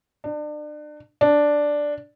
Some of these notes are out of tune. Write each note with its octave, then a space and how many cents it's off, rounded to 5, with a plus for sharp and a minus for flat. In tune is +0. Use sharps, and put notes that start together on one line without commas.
D4 +35
D4 +0